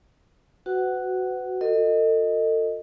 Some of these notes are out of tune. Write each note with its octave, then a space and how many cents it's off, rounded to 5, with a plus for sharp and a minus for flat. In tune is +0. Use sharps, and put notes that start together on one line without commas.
F#4 +0 B4 +35 F#5 +20
F#4 -45 A4 +45 D#5 +0